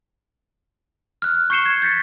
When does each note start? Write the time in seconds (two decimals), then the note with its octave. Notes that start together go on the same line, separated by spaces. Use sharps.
1.22 F6 F#6
1.50 C#6 G6 C7 C#7 E7 G7
1.66 G#6
1.82 G6 A6 B6 C#7